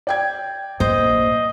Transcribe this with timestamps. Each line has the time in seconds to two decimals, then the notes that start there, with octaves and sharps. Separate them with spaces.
0.07 D5 G5 G#6
0.80 A#1 A#2 C5 D#5